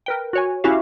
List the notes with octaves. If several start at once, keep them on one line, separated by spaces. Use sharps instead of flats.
A#4 B4 G5
F#4 C#5 G#5
C#4 E4 F#4 G4 E5 F5